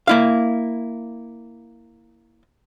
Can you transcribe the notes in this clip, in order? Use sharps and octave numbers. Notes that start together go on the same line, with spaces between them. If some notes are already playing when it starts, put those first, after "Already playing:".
A#3 E4 F5